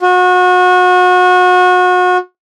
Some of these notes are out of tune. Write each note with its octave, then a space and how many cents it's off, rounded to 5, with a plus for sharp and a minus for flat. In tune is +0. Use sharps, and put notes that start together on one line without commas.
F#4 -30